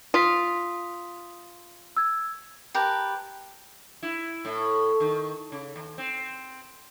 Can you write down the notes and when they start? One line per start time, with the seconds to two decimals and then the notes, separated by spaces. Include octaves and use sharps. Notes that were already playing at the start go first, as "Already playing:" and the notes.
0.14 F4 D#6 B6
1.97 E6 G#6
2.75 G4 A#4 B4 A5
4.03 E4
4.45 A2
5.00 D#3
5.52 C#3
5.76 D#2
5.98 C4